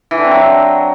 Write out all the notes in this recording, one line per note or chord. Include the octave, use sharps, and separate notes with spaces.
E3
D3
C4
F#3
D4